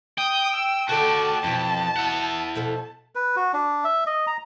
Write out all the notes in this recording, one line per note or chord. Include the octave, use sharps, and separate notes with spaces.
G5 D#6
E6
D3 F#4 A4 D5 A5
F2 B2 E3
E4 F#5
B2 F3 A4
B4
F#4
D4
E5
D#5
A#5